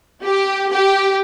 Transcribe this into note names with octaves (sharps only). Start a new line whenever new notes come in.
G4
G4